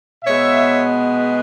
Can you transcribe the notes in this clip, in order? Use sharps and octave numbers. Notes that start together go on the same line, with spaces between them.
B2 G#3 B3 C#5 E5